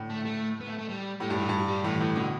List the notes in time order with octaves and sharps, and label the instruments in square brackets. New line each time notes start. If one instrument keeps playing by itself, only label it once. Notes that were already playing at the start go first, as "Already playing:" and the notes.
Already playing: [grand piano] A2 D3
[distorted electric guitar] A3
A3
B3
A3
A3
G3
[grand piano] A2 [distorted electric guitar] G3
[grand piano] G2
[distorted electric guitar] E3
[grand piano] G2
[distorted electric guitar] G3
[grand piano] A2 [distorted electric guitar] E3
[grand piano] A2 [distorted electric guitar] E3
[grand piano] B2 [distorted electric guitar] D3